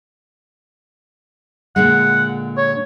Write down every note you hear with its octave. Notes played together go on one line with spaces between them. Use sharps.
A#2 D3 G#3 F#5
C#5